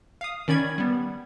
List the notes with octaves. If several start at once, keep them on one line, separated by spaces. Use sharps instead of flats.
F5 D#6
D#3 C#4 D5 B5 G#6
G3 B3